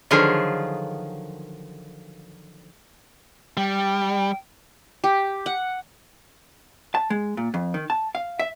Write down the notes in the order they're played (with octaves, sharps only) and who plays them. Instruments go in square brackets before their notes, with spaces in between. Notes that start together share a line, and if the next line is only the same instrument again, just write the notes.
[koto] D3 D#3 F3 F#3 F4 G#4
[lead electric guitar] G3 [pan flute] G5
[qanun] G4
F#5
[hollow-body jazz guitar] A5
G#3
A#2
F2
D#3
A5
F5
E5